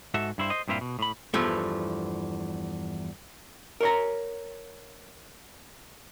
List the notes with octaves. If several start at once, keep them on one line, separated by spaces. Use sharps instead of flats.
G#2 F#4 A4 E5
G2 E4 C5
C5 D#5
G2 A#2 C4 E4 F4
B2
A2 B5
E2 G2 F3 A3
A#4 C#5 A#5